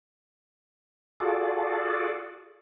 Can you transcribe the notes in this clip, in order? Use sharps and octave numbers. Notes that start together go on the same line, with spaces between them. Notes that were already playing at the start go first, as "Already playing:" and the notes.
F4 F#4 G#4 A4 D5